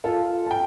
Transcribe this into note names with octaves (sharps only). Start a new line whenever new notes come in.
F4 A4
A5
G5